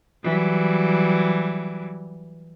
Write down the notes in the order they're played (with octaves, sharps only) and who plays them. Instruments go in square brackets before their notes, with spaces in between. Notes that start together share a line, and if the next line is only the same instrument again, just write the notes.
[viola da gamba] E3 F#3 G3